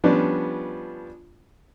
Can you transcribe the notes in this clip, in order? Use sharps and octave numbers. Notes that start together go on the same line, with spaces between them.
F3 G3 B3 C#4 D4